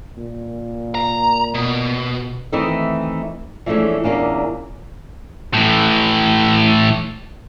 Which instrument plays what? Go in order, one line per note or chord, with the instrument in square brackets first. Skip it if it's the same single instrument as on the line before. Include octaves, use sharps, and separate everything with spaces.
[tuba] A#2
[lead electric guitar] A#5
B2
[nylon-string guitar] D#3 E3 A3 C4 D#4 D#5
E3 F3 G#3 A3 C#4 D4
E2 A#2 A#3 C#4 D4
[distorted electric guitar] A2 E3